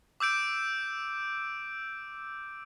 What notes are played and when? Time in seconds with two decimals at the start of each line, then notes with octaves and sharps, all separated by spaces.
0.20 D6 E6 G6 D7